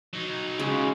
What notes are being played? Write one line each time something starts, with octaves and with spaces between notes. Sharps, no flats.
F#3 D#4
C#3 G#3